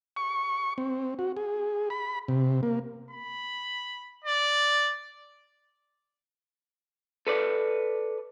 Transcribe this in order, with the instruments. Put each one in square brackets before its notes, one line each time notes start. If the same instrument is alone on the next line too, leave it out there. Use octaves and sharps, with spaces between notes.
[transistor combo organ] C#6
C4
F#4
G#4
B5
C3
A#3
[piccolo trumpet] B5
D5
[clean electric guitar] A4 B4 D5